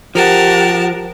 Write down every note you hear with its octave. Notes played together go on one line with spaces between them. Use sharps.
F3 G4 A#4 F#5 A5